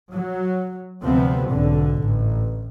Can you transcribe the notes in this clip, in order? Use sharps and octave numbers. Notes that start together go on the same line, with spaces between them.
F#3
D2 C3 F3 B3 C4
B1 G#2 D3
A1